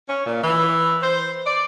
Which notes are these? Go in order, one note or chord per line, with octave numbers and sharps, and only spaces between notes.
C#4
A#2
E3
C5
D5